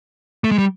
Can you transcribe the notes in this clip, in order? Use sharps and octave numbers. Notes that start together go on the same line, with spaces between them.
A3
G#3
G3